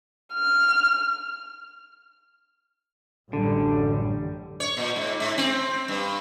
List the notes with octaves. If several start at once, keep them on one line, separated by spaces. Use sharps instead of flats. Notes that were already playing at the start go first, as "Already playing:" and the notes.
F6
A1 F#2 D3 G3
C#5
A#2
G#2
G#2
C4
G2